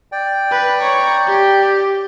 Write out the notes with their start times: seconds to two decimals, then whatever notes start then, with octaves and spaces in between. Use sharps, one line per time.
0.12 D5 G5
0.51 B4
0.80 C#5 A#5
1.27 G4